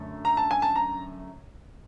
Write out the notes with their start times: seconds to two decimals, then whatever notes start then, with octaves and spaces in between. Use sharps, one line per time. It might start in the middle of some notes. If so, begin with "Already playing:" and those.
Already playing: F#2 D3 A3
0.25 A#5
0.37 A5
0.51 G#5
0.62 A5
0.76 A#5